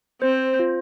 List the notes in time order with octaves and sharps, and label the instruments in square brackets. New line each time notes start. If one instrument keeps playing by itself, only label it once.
[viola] C4 [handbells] C5
[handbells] F4